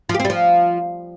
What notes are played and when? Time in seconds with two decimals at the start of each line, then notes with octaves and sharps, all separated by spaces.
0.09 F3
0.14 G4
0.20 C4
0.25 G3
0.30 F3